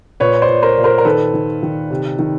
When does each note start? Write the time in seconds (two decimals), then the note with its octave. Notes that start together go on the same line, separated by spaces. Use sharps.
0.20 A#2 B4 C#5
0.42 C5 D5
0.49 A#2
0.63 A#4 C5
0.78 A#2
0.84 A#4 C5
0.98 A#4
1.05 D#3 A4 B4
1.34 D#3
1.63 D#3
1.90 C3
2.19 D#3